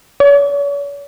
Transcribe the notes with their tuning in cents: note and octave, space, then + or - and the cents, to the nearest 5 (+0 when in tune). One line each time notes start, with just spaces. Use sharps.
C#5 +40